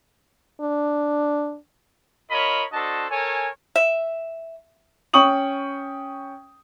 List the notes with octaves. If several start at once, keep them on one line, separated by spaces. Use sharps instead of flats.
D4
F4 A#4 C#5 D#5 B5
D4 F#4 A4 C5 D#5 A5
A4 A#4 C#5 G#5
E5
C#4 G5 C#6 D#6 F#7